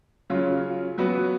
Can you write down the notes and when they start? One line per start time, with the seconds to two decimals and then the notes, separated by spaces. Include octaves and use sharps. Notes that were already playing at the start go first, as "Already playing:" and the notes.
0.30 C#3 F#3 C#4 F4
0.98 F#3 B3 F#4 B4